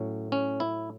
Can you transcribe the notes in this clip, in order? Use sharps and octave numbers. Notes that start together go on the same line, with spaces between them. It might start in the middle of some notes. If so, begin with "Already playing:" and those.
Already playing: A2 F#3 C#4
C#4
E4